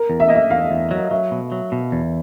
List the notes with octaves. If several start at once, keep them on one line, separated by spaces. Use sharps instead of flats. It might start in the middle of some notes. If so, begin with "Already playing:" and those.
Already playing: A#4
E2
E5
A#3 D#5
E5
E2 F5
E2
F#3
F#3 E5
B2
F#3
B2
E2